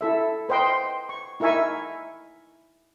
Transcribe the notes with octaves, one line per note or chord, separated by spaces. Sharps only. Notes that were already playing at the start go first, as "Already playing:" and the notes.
E4 A4 E5
B4 C5 D#5 G5 C6
C#6
D#4 E4 A#4 E5 G#5 C#6